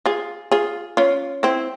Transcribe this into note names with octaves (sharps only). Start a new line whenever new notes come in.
F4 G#4
F4 G#4
C#4 F4
C4 E4